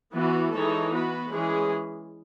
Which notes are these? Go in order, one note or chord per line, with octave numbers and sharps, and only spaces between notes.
E3 B3 F#4
E3 G#3 D#4 A4 C#5
B3 F#4 B4
E3 G#3 C#4 G#4